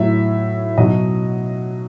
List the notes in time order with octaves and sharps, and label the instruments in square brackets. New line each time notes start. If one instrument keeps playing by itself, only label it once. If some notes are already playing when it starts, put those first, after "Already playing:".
Already playing: [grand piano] A2 F#3 E5
B2 F#3 D#5